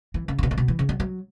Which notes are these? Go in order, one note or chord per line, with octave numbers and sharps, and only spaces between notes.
E3
C#3
A2
B2
A2
B2
E3
C#3
F#3
F#3